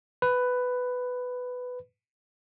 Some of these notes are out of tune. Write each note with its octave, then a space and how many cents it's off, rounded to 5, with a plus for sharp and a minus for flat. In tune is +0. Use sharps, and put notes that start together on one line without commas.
B4 +10